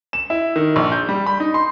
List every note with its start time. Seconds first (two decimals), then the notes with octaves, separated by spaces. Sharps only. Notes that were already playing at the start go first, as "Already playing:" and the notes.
0.13 E7
0.30 E4
0.56 D#3
0.76 A#1
0.92 G6
1.09 G3
1.26 B5
1.40 D#4
1.54 C6